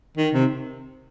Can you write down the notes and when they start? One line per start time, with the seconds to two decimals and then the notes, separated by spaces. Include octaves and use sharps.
0.17 D#3
0.34 C3